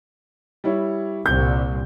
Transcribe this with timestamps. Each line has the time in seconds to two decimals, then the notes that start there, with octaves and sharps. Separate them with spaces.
0.64 G3 E4 C#5
1.26 C2 A#2 G6